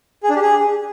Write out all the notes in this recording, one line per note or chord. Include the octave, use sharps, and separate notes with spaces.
G#4
D4
G4
G#4